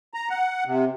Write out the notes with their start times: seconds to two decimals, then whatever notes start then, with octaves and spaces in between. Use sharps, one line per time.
0.14 A#5
0.29 F#5
0.66 C3